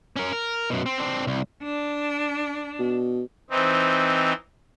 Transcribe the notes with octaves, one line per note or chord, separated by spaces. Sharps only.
C#4 A#4
A#4
F#2 B2
C4
C4 D4
C2
D4
B2
E3 C4 D#4